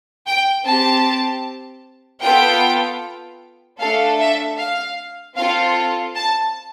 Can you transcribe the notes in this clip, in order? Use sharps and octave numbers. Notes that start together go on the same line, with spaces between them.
G5
C4 G4 A5
B3 F4 A4 G5
A3 D4 A4 F5
E5
F5
C4 F4 A4 F5
A5